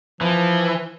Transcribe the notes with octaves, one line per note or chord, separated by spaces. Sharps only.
E3 F3